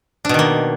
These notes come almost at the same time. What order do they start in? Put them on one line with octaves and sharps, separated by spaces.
D4 B2 D#3 A#3